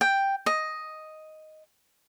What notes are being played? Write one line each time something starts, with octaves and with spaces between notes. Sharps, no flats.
G5
D#5